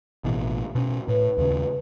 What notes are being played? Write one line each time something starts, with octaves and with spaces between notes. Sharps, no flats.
A1 B2 E3
B2 C#4
A2 B4
D#2 C#3